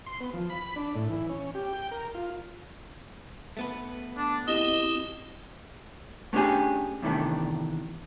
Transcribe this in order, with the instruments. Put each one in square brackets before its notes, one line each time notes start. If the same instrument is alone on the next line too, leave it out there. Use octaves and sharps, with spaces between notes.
[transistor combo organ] C6
B3
F3
B5
D4
A2
E3
C#4
G4
G5
A#4
F4
[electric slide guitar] A3 B3 B4
[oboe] D4
[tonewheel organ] C4 E4 G4 [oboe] D#5
[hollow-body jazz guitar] A3 B3 C#4 D4 G4 G#4
E2 A2 C3 D#3 A3 D4